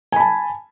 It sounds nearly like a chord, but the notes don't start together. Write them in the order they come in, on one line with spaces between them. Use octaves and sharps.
G#5 B5 A5